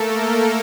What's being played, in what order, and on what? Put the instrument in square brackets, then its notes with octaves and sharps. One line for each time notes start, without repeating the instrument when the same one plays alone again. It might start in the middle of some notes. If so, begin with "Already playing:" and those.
Already playing: [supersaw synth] A3 A#3 A4 A#4